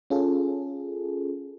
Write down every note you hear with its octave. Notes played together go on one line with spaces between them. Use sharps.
C#4 F4 G#4 A4